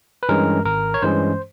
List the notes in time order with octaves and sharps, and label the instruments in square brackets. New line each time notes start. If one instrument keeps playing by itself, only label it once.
[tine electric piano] B4
G2 E3 G#3 C#4 A#4
G#1 A#4
C#5
G2 E3 G#3 C#4 C5